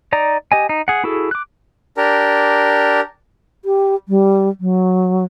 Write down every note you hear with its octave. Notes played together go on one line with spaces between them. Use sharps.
D#4 D5 A#5
G4 D#5 G#5
D#4
G#4 F#5
E4 F#4 G#4 A4
D6 F#6
D4 G4 A#4
G4
G3
F#3